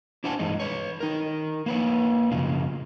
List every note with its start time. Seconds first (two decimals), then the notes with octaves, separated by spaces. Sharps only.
0.24 D4 E4 C5 F#5 G#5 A5
0.39 G2 E3 G#3 D#4
0.60 B4 C#5
1.00 D#4 A#4
1.66 A#3 B4 C#5
2.31 F#2 C#3 F3